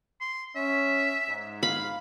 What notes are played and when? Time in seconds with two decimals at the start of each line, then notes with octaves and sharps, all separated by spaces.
0.21 C6
0.56 C#4 E5
1.29 G#2
1.63 F5 B5